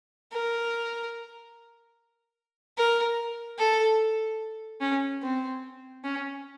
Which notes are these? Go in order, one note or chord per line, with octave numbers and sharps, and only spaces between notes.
A#4
A#4
A4
C#4
C4
C#4